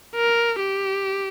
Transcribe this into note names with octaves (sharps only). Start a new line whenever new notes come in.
A#4
G4